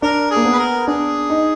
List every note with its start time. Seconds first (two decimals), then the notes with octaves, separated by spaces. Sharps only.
0.02 D4 A#4
0.30 G#4
0.36 A#3
0.45 B3
0.53 B4
0.59 A#4
0.87 D4 G#4
1.30 D#4